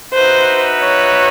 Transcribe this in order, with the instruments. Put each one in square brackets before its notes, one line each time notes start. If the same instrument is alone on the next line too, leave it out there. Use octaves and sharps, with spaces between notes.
[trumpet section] D#4 F#4 B4 E5 [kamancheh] C5
[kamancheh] C#5